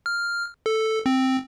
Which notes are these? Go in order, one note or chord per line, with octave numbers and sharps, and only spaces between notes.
F6
A4
C4